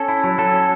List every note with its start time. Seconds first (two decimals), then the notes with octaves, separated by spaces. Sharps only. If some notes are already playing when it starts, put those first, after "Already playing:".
Already playing: C#4 A4
0.08 E4
0.24 F#3
0.38 F#3 A4
0.53 C#4